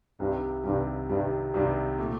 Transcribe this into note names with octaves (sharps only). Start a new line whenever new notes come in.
C2 G2 C3 D#3 G3
C2 G2 C3 D#3 G3
C2 G2 C3 D#3 G3
C2 G2 C3 D#3 G3
A#2 A3